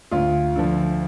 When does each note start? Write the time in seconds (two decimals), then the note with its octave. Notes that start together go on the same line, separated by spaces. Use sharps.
0.11 D2 F4
0.56 D3 F3